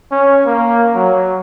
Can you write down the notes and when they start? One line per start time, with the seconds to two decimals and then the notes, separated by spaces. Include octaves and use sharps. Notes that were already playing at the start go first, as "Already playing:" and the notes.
0.11 C#4
0.46 A#3
0.95 F#3